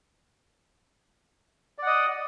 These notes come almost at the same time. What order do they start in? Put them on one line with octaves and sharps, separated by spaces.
D5 F#5 D#5